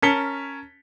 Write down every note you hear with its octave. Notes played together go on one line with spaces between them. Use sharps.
C#4 A#4 A5 B6 C#7 G7